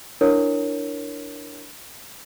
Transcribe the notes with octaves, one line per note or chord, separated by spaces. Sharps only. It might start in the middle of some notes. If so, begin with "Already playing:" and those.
D4 E4 A#4 C#5